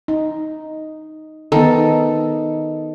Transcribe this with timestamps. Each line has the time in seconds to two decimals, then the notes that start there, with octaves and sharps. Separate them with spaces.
0.08 D#4
1.52 D#3 B3 D#4 A4